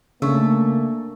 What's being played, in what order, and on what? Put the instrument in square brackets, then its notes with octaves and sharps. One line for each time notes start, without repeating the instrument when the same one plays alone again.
[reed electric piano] C#3 [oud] A3 [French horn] A#3 [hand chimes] D4 C#6 E6